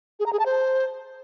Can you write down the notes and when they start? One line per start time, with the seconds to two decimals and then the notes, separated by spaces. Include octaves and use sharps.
0.20 G#4
0.26 A#5
0.33 G#4
0.39 A5
0.46 C5